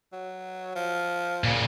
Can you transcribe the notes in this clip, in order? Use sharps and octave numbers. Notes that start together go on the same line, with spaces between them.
F#3
F3
A#2 C#3